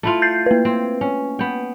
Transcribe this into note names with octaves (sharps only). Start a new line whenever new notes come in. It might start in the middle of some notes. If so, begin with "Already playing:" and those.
A3 E4 F4
G6 A6 C7
A#3 B4
C4
C#4
B3 G5